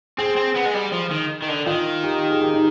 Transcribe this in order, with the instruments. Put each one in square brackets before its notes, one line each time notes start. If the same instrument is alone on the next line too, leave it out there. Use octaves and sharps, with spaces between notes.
[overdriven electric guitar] C4 [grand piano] G#4
[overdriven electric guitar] C4
B3
G#3
G3
F3
D#3
D#3
D3
[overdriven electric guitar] D#3 [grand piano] F4
[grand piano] G4
G#4
G4
D#4